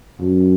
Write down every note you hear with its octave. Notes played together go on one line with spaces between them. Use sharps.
F#2